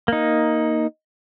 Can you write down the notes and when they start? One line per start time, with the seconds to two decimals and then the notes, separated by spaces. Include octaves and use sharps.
0.08 A#3 D#4